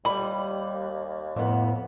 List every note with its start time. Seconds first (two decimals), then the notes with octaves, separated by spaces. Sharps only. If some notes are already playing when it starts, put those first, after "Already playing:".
0.05 D#2 G3 B5
1.36 F2 A2 B3